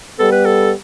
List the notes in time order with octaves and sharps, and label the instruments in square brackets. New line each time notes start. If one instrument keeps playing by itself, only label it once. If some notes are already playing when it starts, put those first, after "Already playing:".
[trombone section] G3 B3 [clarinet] A4
[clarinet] B4
A4